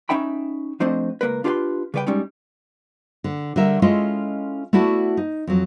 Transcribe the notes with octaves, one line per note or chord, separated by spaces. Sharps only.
C#4 D#4 E5 G5 B5
F3 A3 C4 D4 C5 D#5
C#2 A#3 A#4 B4
D4 F4 G4 B4 G5 C6
C#3 G3 B4 C#5 G5
G3 G#3 C#4 D#4
D3
D3 G3 A#4 E5
G#3 C#4 E4 F4 A4 D#5
A3 B3 E4 F#4 D5 A5
D#4
F2 F#3